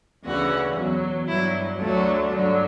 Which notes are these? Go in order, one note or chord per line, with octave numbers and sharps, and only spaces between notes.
D2 C#3 E3 F#4
E2 B2 F#3
G2 F#3 E4
D2 D3 F#3 A3
G2 D3 F#3